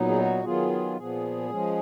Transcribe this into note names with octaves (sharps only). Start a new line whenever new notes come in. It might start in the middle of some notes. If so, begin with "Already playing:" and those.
Already playing: A#2 F#3 B3 D#4
G#4
F#4
D#3 F#3 B3 F4 G#4
A#2 F3 B3 G#4
F3 G#3 C#4